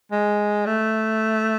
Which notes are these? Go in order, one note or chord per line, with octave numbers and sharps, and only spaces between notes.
G#3
A3